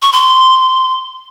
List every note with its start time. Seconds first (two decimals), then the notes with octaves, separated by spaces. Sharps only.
0.02 C#6
0.12 C6